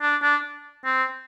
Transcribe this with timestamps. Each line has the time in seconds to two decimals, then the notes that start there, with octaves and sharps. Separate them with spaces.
0.02 D4
0.22 D4
0.85 C4